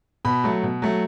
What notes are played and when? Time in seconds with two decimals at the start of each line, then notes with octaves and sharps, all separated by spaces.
0.25 B2 B5
0.44 F#3 A3
0.63 B2
0.82 F#3 A3